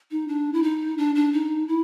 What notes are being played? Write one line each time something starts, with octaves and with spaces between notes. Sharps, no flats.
D#4
D4
E4
D#4
D4
D4
D#4
E4